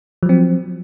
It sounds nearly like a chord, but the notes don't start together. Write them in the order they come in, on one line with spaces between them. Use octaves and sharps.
F3 F#3 C4